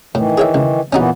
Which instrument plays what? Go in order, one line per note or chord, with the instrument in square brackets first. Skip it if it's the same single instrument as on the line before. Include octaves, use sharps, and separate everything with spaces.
[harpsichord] A2 [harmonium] D#3 E3
[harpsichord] G#4 C#5 E5
C#2
[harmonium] A#2 E3 B3 [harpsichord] C#4 D#4 F#4